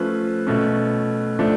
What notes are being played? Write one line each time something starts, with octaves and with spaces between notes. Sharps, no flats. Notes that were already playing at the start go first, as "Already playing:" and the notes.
Already playing: F3 A3 C#4 B4
B2 A3 C#4
F3 A3 D4